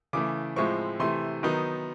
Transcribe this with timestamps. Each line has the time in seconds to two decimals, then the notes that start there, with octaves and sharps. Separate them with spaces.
0.13 C#3 E3 A3 D6
0.56 A2 F3 G#3 C4 E4 C#6
0.99 C3 E3 A3 C6
1.43 D#3 F#3 B3 D#4